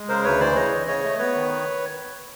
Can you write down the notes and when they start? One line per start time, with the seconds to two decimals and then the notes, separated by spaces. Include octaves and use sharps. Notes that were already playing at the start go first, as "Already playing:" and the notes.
Already playing: G#3
0.09 C#3 A#4 C5
0.24 D2 B4 C#5
0.40 E3 C5 D5
0.55 C#3 C#5 D#5
0.72 E3
0.87 C#3 C#5 D#5
1.03 A3
1.19 B3 B4 C#5
1.34 D#3